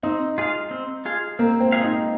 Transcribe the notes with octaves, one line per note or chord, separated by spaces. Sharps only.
C4 D#4
F4 G#4 F5
C4
F4 G#4 F5
A#3 C4
C4
F4 G#4 F5
D#4